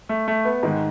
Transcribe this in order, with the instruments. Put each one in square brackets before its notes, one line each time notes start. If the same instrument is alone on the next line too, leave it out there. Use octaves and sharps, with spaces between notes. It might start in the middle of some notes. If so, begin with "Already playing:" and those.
[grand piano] A3
A3
B3
[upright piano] G#2 D#3 G#3